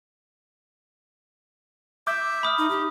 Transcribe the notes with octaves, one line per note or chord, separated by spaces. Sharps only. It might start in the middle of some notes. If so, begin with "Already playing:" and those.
E5 D6 G6
B5 D#6 F6
D#4
G4